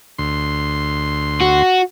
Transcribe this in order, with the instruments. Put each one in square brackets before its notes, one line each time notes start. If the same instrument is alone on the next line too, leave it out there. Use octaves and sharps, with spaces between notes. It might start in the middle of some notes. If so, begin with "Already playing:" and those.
[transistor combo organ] D2 C6
[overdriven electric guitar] F#4